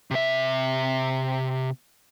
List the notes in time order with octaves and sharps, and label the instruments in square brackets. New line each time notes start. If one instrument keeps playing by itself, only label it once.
[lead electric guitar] C3 E5